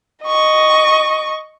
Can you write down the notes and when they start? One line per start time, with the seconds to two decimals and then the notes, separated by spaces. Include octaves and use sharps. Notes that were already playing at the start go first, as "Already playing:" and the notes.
0.24 D#5 C#6